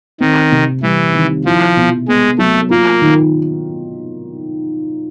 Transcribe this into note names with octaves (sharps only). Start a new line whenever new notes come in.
D#3 C4
C3
E3 G3
D#3
F3 E4
B2
G#3 B3
F#3 A3
A#3 F4
D#3